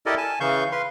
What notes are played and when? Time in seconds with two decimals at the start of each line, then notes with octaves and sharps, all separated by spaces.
0.06 E4 G4 A4 A#4 D5 D#5
0.18 G#5 A5
0.40 C#3 E3 F5 C#6 G6
0.72 B4 F5 C6